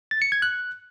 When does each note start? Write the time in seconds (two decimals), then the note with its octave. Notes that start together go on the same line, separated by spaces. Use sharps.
0.11 A6
0.22 C#7
0.32 G#6
0.42 F#6